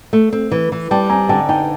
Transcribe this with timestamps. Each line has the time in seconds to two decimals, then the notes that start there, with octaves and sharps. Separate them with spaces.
0.13 A3
0.33 C4
0.51 E3
0.72 E3
0.91 G3 G5 A5
1.09 C4 G#5 A#5
1.29 D3 G5 A5
1.49 D#4 G5 A5